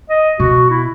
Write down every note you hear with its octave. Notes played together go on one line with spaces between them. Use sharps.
D#5
B2 F#4
E4